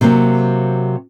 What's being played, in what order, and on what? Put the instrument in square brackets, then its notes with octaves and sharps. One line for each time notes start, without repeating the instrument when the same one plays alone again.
[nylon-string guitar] C3 F#3 A#3 C4